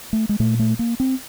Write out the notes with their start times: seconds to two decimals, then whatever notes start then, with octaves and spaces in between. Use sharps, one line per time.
0.13 A3
0.29 G#3
0.40 A#2 A3
0.59 A3
0.79 A#3
1.00 C4